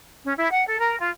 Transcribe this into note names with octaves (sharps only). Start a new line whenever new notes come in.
C#4
E4
F#5
A4
A#4
F4